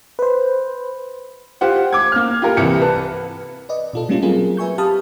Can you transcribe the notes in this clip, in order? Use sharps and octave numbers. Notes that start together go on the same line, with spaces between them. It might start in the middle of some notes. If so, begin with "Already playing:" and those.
B4 C5
F4 G4 C5 F#5
D6 G#6
A#3 F6
F4 G4 A4 A#4
C2 C3 E3 C#7
B4 A5
B4 D5 D#5
B2 F4 A4
G3 A3 A#3 C#4 E4 F4
F#3 C4 F4 G#4 A#4
B4 E5 G#5 C#6 G6
G4 F5 A5 B5 D#6 F6